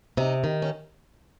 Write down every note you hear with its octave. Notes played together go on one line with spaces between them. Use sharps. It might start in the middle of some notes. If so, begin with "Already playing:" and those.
C3 D#4
D#3
C#4